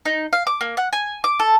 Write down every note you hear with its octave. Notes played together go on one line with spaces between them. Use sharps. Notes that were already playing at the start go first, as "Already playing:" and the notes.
D#4
F5
D6
A#3
F#5
G#5
D6
A4